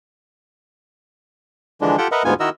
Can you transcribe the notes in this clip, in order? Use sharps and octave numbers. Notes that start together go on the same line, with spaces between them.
D3 E3 F3 G#3 D4
F4 G4 A4 F#5 G5
A#4 B4 D#5 E5 F#5
D2 G#2 B3 F4 G#5
D#3 E4 F#4 A#4 D#5 E6